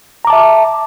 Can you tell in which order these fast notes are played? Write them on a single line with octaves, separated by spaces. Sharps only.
A#5 D6 A5 E5